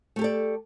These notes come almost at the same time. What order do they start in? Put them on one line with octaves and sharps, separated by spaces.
A3 G4 A4 D5